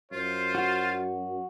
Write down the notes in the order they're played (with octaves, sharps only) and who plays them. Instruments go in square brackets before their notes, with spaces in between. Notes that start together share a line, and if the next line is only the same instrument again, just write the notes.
[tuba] F#2 [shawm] F4 [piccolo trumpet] C5
[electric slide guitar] F#4